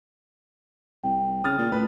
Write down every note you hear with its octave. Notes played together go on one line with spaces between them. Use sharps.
C2 G5
C#3 D#6 F6 A6
A#2
A2 B4